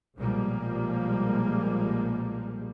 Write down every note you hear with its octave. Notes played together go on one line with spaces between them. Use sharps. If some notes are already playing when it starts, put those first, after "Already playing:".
B1 A#2 F3 G3 G#3 A#3